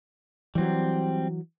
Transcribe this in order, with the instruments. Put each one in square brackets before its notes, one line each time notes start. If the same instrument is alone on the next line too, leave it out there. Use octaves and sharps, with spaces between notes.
[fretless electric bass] E3 F#3 [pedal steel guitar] G3 C4